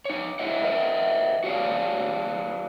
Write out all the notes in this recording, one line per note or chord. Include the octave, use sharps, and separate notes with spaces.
D#4 C#5
E4 C#5 D#5 E5 F#5
A#4 C5 D#5 E5
F#4 G#4 C#5 D5 F5